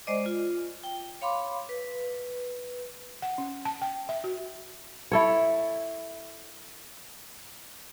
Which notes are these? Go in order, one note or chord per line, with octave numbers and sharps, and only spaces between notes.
G#3 C5 D5 D#5 D6
F4
G5
C#5 F5 B5 C6 D6
B4
F#5
C#4
A5
G5
E5
F#4
E4 A4 C#5